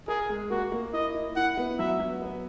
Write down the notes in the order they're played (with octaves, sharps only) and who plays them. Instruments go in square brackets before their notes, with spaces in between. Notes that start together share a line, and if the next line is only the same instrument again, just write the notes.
[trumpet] G#4 [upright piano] A#4
[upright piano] G#3
[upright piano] A#3 [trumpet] F#4
[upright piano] A#3
[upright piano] E4 [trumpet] D#5
[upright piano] E4
[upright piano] E4 [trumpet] F#5
[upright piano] B3
[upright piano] F#3 [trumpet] E5
[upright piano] F#3
B3